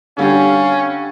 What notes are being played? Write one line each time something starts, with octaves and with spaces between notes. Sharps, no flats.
D3 G3 C#4 G4 F5